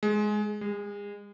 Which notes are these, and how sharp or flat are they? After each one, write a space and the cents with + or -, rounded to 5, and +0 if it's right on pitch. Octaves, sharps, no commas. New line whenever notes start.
G#3 +15
G#3 -35